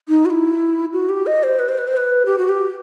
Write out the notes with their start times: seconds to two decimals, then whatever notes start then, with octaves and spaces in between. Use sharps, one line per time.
0.09 D#4
0.25 F#4
0.30 E4
0.93 F#4
1.09 G4
1.27 D#5
1.43 C5
1.59 B4
1.69 C5
1.78 B4
1.88 C5
1.97 B4
2.26 G4
2.38 F#4
2.49 G4